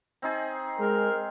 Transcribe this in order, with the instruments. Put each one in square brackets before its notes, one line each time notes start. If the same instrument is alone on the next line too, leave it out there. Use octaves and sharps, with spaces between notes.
[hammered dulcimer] C4 D#4 G#4
[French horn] G#3 [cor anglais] A#4